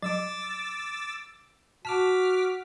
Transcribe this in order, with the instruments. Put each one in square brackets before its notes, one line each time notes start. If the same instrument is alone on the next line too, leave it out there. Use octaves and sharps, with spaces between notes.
[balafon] F#3 [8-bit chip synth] D6 E6 A6
[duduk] F#4 [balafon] A5 [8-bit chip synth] D6 F6 B6